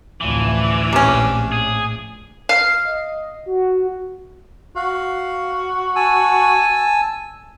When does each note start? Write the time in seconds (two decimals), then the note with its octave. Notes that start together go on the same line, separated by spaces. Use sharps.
0.21 A1 D2 C3 E3 F3 A3 D4
0.93 A#1 A2 C3 C#4
1.52 G#4
2.49 F5
2.85 D#5
3.46 F#4
4.76 F#4 F5
5.95 G#5 A5 E6